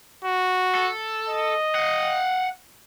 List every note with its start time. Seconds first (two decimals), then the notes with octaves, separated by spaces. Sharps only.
0.25 F#4
0.75 A4
1.28 D#5
1.75 F5 F#5